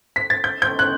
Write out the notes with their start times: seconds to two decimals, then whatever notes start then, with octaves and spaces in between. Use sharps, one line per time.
0.16 B6
0.30 A6
0.44 G6
0.62 G6
0.79 F#6